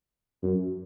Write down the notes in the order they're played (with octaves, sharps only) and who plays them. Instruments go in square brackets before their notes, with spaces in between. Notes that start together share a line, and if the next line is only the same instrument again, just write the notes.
[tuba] F#2